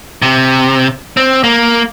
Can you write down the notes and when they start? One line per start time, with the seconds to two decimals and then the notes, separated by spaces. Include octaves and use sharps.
0.22 C3
1.17 C4
1.44 A#3